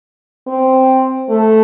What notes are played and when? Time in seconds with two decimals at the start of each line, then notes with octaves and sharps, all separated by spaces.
0.47 C4
1.30 A3